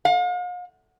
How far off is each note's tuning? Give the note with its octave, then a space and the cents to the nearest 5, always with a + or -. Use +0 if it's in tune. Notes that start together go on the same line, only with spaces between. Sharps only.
F5 +45